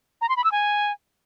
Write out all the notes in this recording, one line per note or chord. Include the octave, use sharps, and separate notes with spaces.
A#5
C6
B5
E6
G#5